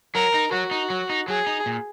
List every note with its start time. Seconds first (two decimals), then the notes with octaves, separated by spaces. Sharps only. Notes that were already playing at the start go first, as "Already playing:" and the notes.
0.15 F#3 A#4
0.34 D#4
0.52 F#3 F#4
0.71 D#4
0.90 F#3
1.10 D#4
1.28 F#3 G#4
1.47 D#4
1.66 A#2